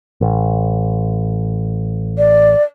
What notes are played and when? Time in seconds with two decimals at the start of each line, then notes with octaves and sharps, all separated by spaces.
0.21 A1
2.17 D5